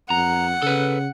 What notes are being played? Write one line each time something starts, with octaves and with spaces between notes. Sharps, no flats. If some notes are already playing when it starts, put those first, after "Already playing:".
F2 F#5 A#5
C#3 A4 B4